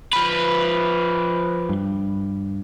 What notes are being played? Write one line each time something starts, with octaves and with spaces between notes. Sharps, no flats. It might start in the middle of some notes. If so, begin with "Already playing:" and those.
F3 B4
G2